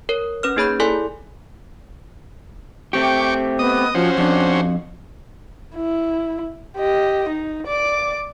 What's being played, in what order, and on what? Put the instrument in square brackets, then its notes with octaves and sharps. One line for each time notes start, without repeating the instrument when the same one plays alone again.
[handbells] A#4 C#5
C#4 B4 F6
A#3 D#4 G#4 C#5 B5 G6
E4 A4 D5 G#5 C6
[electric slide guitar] A3 C4 G4 [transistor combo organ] G5 C#6 D6
[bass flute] B3 [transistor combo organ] D#5 D#6
[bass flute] F3 [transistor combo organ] C#4 F#4 C5
[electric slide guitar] F2 [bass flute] D4
[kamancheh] E4
G4 D#5
D#4
D5 D6